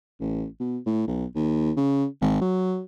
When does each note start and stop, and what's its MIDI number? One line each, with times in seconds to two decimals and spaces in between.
0.20 0.46 33
0.60 0.78 47
0.86 1.06 45
1.07 1.26 35
1.35 1.72 39
1.76 2.06 49
2.22 2.38 32
2.42 2.82 54